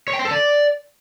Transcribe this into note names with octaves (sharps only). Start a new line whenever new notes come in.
C#5
G5
C5
A4
D5